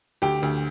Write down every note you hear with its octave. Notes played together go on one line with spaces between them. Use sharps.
D2 G4 G5
D2